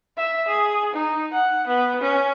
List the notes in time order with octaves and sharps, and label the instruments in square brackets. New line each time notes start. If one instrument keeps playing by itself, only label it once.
[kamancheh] E5
G#4
D#4
F#5
B3
C#4